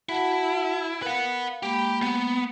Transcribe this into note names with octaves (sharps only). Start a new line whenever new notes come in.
E4 F#4 F#5 A5
A#4 B4 F5 F#5
G#3 A#3 G4 B5
B3